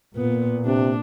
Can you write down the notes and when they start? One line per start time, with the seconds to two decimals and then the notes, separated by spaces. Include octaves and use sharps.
0.16 A#2 B3
0.66 C3 D4